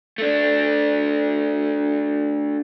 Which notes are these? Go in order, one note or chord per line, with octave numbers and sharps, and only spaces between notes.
A3 D4